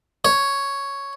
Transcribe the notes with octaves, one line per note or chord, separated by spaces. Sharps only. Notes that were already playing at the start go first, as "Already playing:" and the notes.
C#5